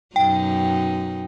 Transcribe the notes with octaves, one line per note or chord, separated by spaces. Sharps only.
F#2 B2 D#4 G5